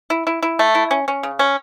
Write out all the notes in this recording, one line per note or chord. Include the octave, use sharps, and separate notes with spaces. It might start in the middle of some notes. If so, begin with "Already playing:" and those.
E4
E4
E4
A3
E4
C#4
C#4
C#3
C#4